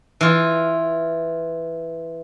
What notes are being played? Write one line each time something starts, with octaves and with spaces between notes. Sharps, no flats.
E3 F4